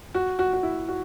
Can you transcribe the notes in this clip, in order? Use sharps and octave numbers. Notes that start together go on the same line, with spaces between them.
F#4
F#4
F#4
E4
F#4